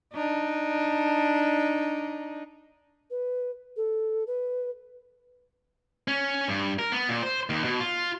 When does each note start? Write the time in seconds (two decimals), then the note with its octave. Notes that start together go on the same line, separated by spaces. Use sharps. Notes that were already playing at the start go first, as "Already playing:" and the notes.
0.13 D4 D#4
3.11 B4
3.77 A4
4.27 B4
6.08 C#4
6.49 G2
6.79 A#4
6.92 B3
7.09 A#2
7.23 C5
7.50 D#2
7.64 B2
7.80 F4